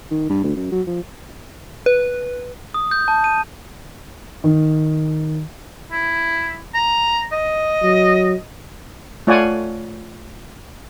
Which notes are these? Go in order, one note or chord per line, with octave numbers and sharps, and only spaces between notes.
D#3
G2
D2
F#2
F#3
F3
B4
D#6
G6
A5
D#7
D#3
E4
A#5
D#5
F#3
A3 F4 C#5 D5 F#5 G#5